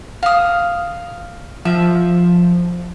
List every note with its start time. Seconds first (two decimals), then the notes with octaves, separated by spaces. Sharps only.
0.23 F5 D#6
1.65 F3 E5